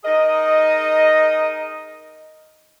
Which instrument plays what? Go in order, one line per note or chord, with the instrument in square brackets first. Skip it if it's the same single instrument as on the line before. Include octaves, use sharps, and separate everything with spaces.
[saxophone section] D#4 G#4 A#4 D#5